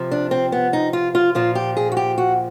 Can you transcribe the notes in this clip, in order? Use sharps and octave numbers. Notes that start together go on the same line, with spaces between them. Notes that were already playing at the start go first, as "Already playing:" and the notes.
Already playing: C3 F3
D4
C4
B3
D#4
F4
F4
A#2 F3 F4
G4
G#4
F#4
G4
F#4